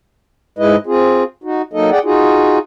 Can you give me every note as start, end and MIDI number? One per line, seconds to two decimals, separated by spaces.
0.59 0.76 44
0.59 0.76 56
0.59 0.76 64
0.59 0.76 71
0.59 0.76 75
0.86 1.23 60
0.86 1.23 65
0.86 1.23 68
1.44 1.62 63
1.44 1.62 66
1.73 1.90 54
1.73 1.90 58
1.73 1.90 63
1.73 1.90 69
1.73 1.90 75
1.91 1.99 68
1.91 1.99 74
1.91 1.99 78
1.91 1.99 79
2.04 2.59 63
2.04 2.59 65
2.04 2.59 66
2.04 2.59 68